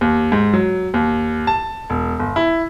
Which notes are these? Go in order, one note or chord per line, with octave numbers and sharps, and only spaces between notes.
D#2
G#2
F#3
D#2
A5
E1
G1
E4